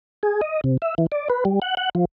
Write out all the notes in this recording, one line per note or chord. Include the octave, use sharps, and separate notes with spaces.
G#4
D#5
C3
E5
E3
D5
B4
G3
F#5
F#5
F3